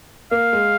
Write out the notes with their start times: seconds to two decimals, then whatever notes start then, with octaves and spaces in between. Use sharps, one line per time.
0.31 A#3 F5
0.53 G#3